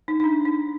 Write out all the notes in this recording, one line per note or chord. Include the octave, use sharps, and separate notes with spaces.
D#4
D#4
D4
D#4